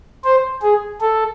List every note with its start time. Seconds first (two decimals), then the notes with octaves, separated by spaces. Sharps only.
0.24 C5
0.62 G#4
1.00 A4